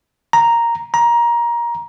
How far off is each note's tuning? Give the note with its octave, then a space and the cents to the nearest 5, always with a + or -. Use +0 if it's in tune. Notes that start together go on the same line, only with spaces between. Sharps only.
A#5 +0
A#5 +20